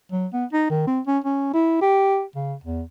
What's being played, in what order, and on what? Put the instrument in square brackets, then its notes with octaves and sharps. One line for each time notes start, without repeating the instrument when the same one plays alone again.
[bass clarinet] F#3
B3
D#4
D#3
C4
C#4
C#4
E4
G4
C#3
E2